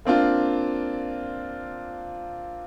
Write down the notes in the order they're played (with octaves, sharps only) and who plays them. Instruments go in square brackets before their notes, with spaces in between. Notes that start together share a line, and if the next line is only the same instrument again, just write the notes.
[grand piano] A#3 C4 D4 F4